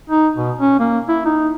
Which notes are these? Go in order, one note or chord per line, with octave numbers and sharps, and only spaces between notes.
D#4
B2
C#4
A#3
E4
D#4